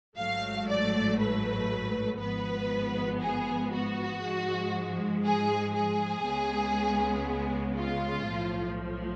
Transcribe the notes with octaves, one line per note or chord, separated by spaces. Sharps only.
A1 G#2 F#3 A3 F5
D5
B4
G#1 G#2 F3 B3 B4
G#4
F#4
G#2 F3 G#3
G#4
G#4
C#2 C#3 G#3 B3
F4
B1 A2 F3